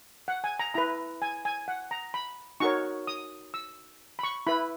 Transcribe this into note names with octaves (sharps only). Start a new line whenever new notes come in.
F#5
G#5
A#5
E4 B4 A#5
G#5
G#5
F#5
A#5
B5
D#4 F#4 A#4 C#5 C#6
D#6
E6
B5
C#6
E4 B4 B5